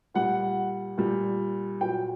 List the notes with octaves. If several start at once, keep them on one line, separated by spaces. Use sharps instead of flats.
A#2 G3 F#5
A#2 G3
A#2 F#3 G5